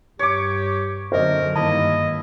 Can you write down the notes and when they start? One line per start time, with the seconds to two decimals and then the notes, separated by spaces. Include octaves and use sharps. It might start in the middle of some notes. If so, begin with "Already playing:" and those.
0.19 G2 G4 C#5 D6
1.12 F#2 D3 A#4 C5 D#5
1.56 G2 D#3 A#3 E4 D#5 A5